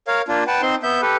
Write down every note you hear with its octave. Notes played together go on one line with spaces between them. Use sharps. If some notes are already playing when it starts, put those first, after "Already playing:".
A#4 C#5 F5
A#3 D4 F4
B4 F#5 G5 A5
C4 D#4 C5 C6
B3 E5 G6
G4 A4 B4